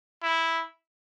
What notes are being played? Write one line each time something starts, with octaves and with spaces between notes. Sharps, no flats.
E4